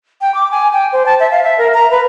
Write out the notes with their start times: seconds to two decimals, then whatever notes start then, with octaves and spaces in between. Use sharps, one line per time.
0.21 G5
0.34 D6
0.51 G#5
0.73 G5
0.92 C5
1.06 A5
1.20 E5
1.31 F5
1.43 E5
1.58 A#4
1.74 A#5
1.91 B4